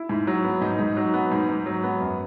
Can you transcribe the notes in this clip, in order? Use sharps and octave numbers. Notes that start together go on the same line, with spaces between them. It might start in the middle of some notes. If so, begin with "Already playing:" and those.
Already playing: E4
G#2
F#3
B3
G#2 D#4
G#2
F#3
B3
G#2
G#2
F#3
B3
F#2